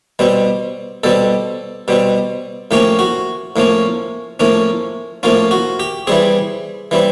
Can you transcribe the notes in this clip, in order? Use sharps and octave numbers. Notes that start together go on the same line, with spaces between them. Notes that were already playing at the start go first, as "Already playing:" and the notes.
B2 G3 C4
B2 G3 C4 A4
B2 G3 C4
A2 F3 A#3 C#4 G4
F#4
A2 F3 A#3 C#4
A2 F3 A#3 C#4
A2 F3 A#3 C#4 F4
F#4
G4
E3 G3 C4 G#4
E3 G3 C4